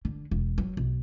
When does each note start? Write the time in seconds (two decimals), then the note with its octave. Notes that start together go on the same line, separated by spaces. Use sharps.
0.05 D3
0.31 E1
0.58 F#3
0.77 B1